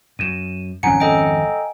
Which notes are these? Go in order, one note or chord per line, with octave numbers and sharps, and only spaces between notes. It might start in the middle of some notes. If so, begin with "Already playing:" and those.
F#2 D#7 E7
G#1 F2 C#4 F#5 G#5 A#5 C#7
A4 D#5 G5